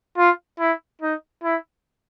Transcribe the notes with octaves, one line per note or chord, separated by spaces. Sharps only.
F4
E4
D#4
E4